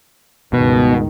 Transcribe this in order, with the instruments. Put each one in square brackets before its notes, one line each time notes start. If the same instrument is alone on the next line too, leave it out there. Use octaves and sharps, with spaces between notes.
[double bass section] C#2 G2 D#3 [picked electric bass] B2